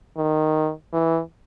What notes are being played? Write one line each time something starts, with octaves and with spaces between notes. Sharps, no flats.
D#3
E3